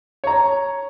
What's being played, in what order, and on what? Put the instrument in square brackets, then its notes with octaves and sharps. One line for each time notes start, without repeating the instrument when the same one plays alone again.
[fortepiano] C#5 A#5